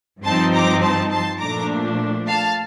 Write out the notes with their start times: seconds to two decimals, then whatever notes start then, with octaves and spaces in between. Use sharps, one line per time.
0.25 G2 F3 C4 D#4 A5 C6
0.54 A#5 D6
0.83 A5 C6
1.12 A5 C6
1.40 A#2 F3 A3 D4 A#5 D6
2.28 F5 A5